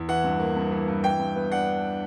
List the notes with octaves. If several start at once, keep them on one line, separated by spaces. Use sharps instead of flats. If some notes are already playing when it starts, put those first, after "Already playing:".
Already playing: E2
E3 F#5
G2
A#3
G2
E3
G2
E3 G5
G2
B3
D4 F#5